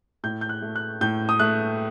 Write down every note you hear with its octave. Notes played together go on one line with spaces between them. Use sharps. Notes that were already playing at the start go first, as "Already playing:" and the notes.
A2 G6
G6
F#6
A3
F#6
A2 G6
D#6
A3 F#6